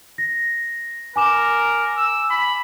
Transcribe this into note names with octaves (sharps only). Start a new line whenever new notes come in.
A#6
A#4 G#5 D6 E7
E6
B5